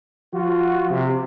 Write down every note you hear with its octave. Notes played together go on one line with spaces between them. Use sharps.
F3 F4 F#4
C3